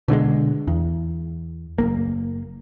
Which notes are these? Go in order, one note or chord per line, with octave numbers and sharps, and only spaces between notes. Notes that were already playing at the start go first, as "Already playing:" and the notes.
B2 D3 F#3 G#3
E2
F#1 E2 A#3